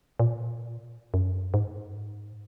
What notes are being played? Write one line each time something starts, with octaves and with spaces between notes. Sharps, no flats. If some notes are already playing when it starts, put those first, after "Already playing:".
A#2
F#2
G#2